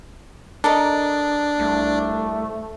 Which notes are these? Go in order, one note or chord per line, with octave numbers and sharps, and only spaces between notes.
D4 A4 A#4 D#5
C2 A3